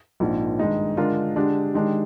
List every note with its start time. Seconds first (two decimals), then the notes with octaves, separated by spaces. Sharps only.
0.20 A#1 G#2 F3 A#3
0.59 G2 D#3 G#3 D#4
0.97 D3 G#3 D4 F4 A#4
1.36 D3 G#3 D4 G4
1.74 D#3 G#3 D4 G4